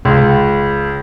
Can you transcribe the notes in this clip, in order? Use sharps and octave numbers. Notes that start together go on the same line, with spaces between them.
C#2